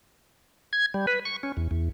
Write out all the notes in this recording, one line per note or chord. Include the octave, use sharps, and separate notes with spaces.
G#6
G3
B4
C#6
C#4
E2
E2